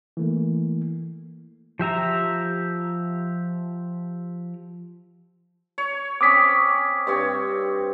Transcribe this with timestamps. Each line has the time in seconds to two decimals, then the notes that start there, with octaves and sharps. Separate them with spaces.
0.17 E3 A3 A#3
1.79 F3 G4 E5 A#5
5.78 C#5
6.21 C4 C#4 D6 D#6 B6
7.07 G2 C4 C#5